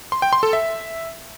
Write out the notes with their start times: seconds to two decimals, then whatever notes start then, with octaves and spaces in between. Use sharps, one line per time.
0.12 C6
0.22 G5
0.33 C6
0.43 A4
0.53 E5